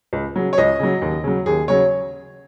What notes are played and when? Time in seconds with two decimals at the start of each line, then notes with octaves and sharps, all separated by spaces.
0.13 C#2
0.36 C#3 F#3
0.53 C#5
0.58 C#2 D#5
0.80 C#3 F#3
1.02 D#2
1.24 C#3 F#3
1.46 D#2 G#4
1.68 C#3 F#3 C#5